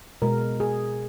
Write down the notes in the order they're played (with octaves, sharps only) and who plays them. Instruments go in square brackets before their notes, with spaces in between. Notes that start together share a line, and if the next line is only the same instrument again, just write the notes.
[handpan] B2 G#3 A#4
G#4